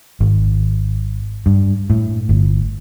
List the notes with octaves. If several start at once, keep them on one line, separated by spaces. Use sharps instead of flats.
G#1
G2
A2
G1